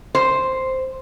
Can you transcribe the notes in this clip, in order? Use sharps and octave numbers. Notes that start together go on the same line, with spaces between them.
C5